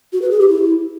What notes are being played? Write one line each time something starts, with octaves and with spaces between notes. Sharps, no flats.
F#4
B4
G#4
G4
E4